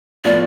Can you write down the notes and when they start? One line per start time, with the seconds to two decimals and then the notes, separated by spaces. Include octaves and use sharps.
0.25 A2 F3 B3 F4 D5